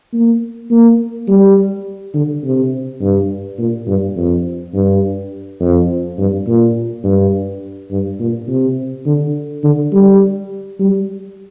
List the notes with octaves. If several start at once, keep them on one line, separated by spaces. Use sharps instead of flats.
A#3
A#3
G3
D3
C3
G2
A#2
G2
F2
G2
F2
G2
A#2
G2
G2
A#2
C3
D3
D3
G3
G3